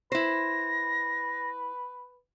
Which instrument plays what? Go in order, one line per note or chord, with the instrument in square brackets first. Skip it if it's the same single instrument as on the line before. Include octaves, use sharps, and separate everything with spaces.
[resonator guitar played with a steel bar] E4 C5 [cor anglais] B4 [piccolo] A#6